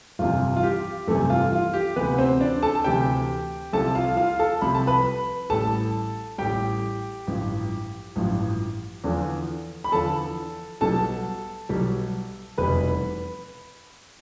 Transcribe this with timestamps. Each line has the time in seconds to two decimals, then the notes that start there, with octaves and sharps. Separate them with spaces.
0.19 G1 F2 C3 E3 G3 F4
0.57 F4
0.63 G4
1.08 G1 F2 C3 E3 G3 A3 A4
1.30 F4
1.52 F4
1.74 G4
1.96 D2 C3 E3 B3 B4
2.18 C4 C5
2.41 D4 D5
2.62 A4 A5
2.75 A5
2.84 D2 C3 E3 G4 G5
3.73 C2 C3 F3 A4 A5
3.95 F4 F5
4.17 F4 F5
4.39 A4 A5
4.61 C2 C3 F3 B5
4.75 A5
4.87 B4 B5
5.50 A1 A2 G3 A4 A5
6.38 A1 A2 G3 G4 G5
7.27 A1 G2 F3
8.16 A1 G2 F3
9.04 E2 D3 F3
9.84 B5
9.92 E2 D3 F3 A4 A5
10.81 B1 B2 G3 A4 A5
11.69 B1 B2 G3
12.58 F1 E2 B2 G3 B4 B5